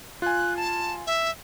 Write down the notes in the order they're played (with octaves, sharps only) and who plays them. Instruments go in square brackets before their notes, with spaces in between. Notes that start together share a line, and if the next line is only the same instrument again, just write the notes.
[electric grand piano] F4 G#5 [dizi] F#6
[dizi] A5
E5